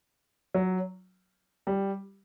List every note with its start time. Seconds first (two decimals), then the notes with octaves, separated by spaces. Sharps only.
0.55 F#3
1.67 G3